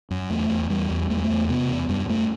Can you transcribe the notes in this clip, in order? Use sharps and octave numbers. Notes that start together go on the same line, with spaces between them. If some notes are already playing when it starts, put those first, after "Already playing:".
F#2
E2 A3
E2
E2 G3
E2
E2 A3
G3
A3
E2
C3 B3
E2
F#2 G3
F#2 A3